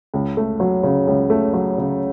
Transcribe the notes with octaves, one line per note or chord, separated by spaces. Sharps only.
C#2
A3
F#3
C#3
C#2
A3
F#3
C#3